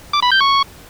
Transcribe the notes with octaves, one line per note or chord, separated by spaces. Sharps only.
D6
B5
G6
C#6